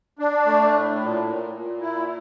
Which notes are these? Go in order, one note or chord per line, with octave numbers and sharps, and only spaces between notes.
D4
A3
A2
A#2
A#2
A#2
E4